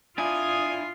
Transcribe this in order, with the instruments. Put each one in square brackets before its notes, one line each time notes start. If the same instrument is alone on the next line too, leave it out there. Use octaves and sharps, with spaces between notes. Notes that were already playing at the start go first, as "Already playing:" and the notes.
[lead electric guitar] D4 E4 [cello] F4 [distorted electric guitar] G#5 [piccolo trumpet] D#6